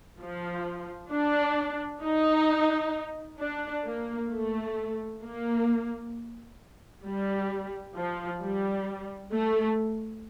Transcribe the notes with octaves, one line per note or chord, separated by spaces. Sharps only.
F3
D4
D#4
D4
A#3
A3
A#3
G3
F3
G3
A3